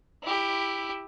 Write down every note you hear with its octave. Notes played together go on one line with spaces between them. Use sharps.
E4 G4